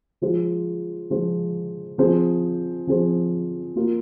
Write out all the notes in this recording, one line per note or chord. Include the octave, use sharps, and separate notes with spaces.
F3 G#3 F4 C5
F3 G#3 F4 C5
F3 C4 G#4 C5
F3 C4 G#4 C5
A#3 F4 A#4